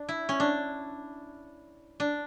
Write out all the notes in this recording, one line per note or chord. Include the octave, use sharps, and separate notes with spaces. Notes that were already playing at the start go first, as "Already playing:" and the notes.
Already playing: D4
E4
C#4
D4
D4